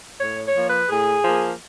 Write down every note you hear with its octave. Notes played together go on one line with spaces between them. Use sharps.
A2 C#5
C#5
F3 A#3
B4
A2 G#4
F3 A#3